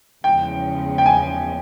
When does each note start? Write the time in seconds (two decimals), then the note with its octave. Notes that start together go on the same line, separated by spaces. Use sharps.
0.24 E2 C#3 F3 G#3 B3 G5
0.98 G5
1.06 G#5